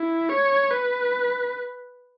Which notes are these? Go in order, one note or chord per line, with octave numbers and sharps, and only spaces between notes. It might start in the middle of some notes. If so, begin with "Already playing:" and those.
Already playing: E4
C#5
B4